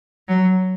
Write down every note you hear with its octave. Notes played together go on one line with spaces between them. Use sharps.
F#3